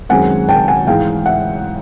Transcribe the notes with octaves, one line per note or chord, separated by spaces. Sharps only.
F#2 D#3 G#3 C4 F#5 G#5
G5 A5
F#5 G#5
G#2 E3 G#3 F5 G5
E5 F#5